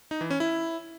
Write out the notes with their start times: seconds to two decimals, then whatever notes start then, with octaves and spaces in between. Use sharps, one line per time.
0.11 D#4
0.21 E3
0.30 C#4
0.40 E4